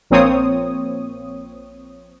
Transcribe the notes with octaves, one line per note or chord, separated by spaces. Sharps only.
A#1 F3 A#3 C4 C#5 D#6